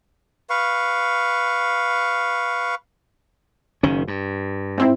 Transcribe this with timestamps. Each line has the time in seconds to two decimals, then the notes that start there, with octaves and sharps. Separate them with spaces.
0.50 B4 F5 C#6
3.83 F#1 D#3 C#4
4.08 G2
4.78 G#2 C4 E4